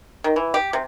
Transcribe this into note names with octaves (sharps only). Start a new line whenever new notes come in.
D#3
E3
G4
C3